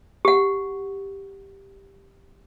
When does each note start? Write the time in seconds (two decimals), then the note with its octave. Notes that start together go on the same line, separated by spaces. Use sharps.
0.25 G4 F#5